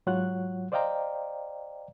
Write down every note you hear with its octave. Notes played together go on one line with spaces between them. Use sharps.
G#2 F#3 F4 C#5 F#5 F#6
C5 D5 D#5 F5 G5 A#5